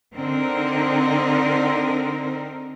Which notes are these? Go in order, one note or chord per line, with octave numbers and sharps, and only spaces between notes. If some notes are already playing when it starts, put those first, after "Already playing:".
D3 C4 D#4 A#4